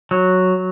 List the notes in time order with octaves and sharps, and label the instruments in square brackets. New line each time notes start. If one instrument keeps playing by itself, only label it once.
[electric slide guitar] F#3